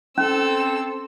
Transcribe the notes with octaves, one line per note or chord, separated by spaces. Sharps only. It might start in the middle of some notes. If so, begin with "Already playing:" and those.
C4 C#4 A4 E6